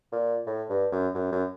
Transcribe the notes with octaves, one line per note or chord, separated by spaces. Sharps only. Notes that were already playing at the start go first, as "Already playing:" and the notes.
A#2
A2
G2
F#2
F#2
F#2